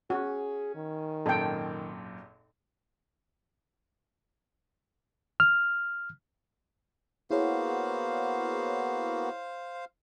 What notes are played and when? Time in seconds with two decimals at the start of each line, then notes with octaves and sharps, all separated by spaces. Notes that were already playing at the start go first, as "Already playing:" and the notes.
0.10 C#4 F#4 G#4
0.75 D#3
1.26 G#1 F#2 A#2 A4 G5
5.40 F6
7.31 A#3 B3 E4 F#4 G#4 C5 C#5 F5